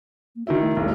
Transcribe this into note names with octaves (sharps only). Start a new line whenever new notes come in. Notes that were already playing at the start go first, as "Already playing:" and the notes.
A#3
D#3 E4 F#4 E5
A3
E1 B1